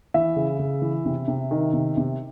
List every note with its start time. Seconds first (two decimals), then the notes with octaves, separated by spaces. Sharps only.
0.14 E3 E5
0.36 C#3
0.59 C#3
0.82 E3
1.05 C3
1.28 C3
1.51 D#3
1.73 C3
1.97 C3